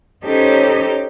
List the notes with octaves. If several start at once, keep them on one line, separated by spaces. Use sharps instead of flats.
C#4 D#4 G4 A4 C5 C#5